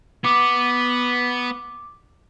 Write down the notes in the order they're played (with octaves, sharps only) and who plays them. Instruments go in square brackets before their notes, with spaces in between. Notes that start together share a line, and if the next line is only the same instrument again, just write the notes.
[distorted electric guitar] B3 [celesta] D6